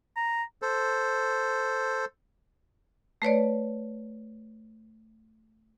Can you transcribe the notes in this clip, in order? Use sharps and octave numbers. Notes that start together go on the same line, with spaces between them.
A#5
A4 C5
A3 B4 C#5 D5